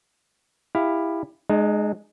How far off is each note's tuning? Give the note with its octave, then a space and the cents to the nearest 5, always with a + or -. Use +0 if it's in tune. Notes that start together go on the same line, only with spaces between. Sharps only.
E4 +0 G4 +25 F5 +0
G#3 +10 D#4 -40